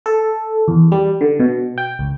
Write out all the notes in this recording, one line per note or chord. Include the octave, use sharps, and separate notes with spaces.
A4
E2
G3
D3
B2
G5
C#2